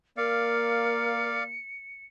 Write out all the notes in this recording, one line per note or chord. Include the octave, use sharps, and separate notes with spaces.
A#3 A#4 D5 F5 C#7